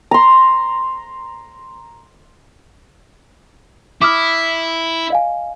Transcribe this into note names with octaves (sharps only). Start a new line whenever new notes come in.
A#5 C6
E4 D6 D#6 F6
D#5 F5 G#5